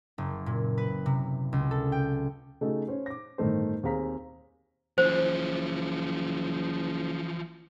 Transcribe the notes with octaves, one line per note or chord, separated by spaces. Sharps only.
F#1
A#2
B4
C3
C#2
A4
G5
C#3 A3 D#4 F#4 G#4 A4
C#4 C5 C#5
D6 A#6
G1 A2 D#3 A3 C5
D#2 C4 G#4 F5 A#5 B6
F#1 E3 F3 C5